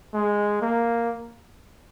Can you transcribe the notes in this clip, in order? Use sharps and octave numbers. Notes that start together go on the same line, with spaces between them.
G#3
A#3